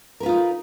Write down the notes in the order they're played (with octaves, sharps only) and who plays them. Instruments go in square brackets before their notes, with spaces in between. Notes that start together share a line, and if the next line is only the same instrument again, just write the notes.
[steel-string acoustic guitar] A#4
B4
F4
D#4